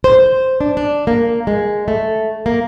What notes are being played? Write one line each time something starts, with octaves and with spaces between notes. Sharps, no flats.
C5
D4
D4
A#3
G#3
A3
A#3